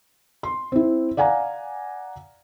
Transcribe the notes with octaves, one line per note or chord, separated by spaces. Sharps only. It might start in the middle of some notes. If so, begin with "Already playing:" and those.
C6
C4 E4
D5 F5 F#5 G#5 A#5